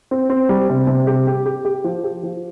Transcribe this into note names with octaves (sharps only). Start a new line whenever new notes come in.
C4
C4
G3
C3
C3
G4
G4
G4
G4
F3
G4
F3